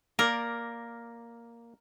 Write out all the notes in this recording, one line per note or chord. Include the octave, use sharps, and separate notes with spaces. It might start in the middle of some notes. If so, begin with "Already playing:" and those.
A#3 A#4 D5